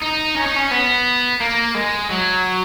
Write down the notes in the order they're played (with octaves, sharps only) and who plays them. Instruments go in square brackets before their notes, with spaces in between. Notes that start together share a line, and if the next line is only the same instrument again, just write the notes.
[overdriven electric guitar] D#4
C#4
D#4
C#4
B3
A#3
G#3
F#3